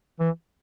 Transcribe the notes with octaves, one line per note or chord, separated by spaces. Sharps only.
E3